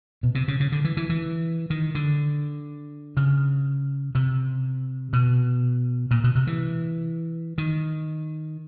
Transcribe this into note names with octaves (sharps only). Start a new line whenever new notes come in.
B2
C3
C#3
C#3
D3
E3
E3
E3
D#3
D3
C#3
C3
B2
A#2
B2
C3
E3
D#3